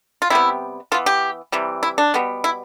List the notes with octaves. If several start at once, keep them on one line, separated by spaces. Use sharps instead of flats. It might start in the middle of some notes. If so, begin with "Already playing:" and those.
F4
C3 G3 B3 E4
E3 B3 F4
G4
C3 E3 G3
E4
D4
B2 G3 B3
E4